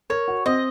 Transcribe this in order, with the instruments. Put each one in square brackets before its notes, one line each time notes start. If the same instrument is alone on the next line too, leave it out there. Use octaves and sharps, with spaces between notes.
[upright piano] A#4 [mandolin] C#5
[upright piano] F#4
[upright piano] C4 [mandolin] D#5